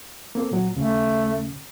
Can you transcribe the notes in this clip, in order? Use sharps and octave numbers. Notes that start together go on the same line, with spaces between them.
A#3 C4 A4
A#2 F#3
D#2 C#3 A3 C#4